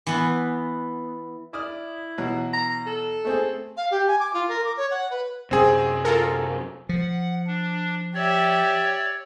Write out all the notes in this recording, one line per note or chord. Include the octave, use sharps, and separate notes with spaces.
E3 B3
E4 D5 D#6 F6
B2 E3 F#3
A#5
A4
A3 C4 G#4
F5
G4
G#5
D6
F4
A#4
D6
C#5
F#5
B4
F#2 C3 C4 G#4
F4 A4 A#4
F3 F#5
D4
G4 C#5 D5 E5